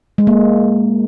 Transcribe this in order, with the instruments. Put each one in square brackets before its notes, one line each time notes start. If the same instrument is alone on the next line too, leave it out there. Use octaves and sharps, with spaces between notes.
[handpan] G#3
A#3